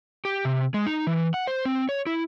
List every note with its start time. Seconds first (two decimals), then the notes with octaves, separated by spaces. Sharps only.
0.25 G4
0.45 C3
0.74 G#3
0.86 D#4
1.07 E3
1.34 F#5
1.47 C5
1.65 C4
1.89 C#5
2.06 E4